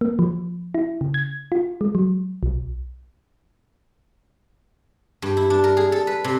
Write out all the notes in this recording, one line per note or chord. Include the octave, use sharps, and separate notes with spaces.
A#3
F3
E4
C#3
G#6
F4
G#3
F#3
B1
G2
E4
D4
A#4
G#4
A4
B4
C3